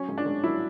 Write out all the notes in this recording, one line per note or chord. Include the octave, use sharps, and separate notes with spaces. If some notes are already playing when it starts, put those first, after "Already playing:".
Already playing: F#3 C#4
G#2
D4
G#2
F#3 E4